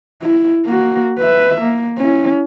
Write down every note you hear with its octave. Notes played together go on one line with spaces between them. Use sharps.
E4
A#3 F#4
B4 E5
A#3
C#4 E4